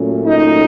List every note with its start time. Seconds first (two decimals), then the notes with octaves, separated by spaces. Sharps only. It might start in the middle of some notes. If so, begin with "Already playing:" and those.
Already playing: A#2 F#3 A3 C#4
0.26 D#4